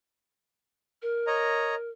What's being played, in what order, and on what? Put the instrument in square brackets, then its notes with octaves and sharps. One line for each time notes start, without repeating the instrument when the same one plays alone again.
[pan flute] A#4
[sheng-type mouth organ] C#5 D#5 A#5